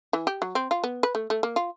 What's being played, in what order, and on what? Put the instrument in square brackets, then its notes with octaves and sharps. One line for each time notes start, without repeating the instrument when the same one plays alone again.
[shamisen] E3
G4
F#3
C4
F4
B3
B4
A3
A3
A#3
F4